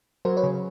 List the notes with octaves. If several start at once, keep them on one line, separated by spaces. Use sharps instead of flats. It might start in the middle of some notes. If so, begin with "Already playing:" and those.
F#3 A#4 C5
B4 C#5
C#3